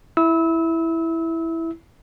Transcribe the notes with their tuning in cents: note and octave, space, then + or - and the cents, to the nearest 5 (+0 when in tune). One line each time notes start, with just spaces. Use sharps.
E4 +0 E6 -30